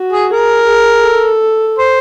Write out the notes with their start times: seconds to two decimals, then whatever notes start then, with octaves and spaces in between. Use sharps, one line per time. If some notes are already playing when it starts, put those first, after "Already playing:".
Already playing: F#4
0.12 G#4
0.31 G#4 A#4
0.67 G#4
1.04 A4
1.78 C5